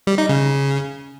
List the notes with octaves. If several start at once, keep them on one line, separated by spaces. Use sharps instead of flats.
G3
D#4
C#3